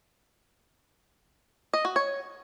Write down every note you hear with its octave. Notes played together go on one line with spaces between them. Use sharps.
D#5
F#4
C#5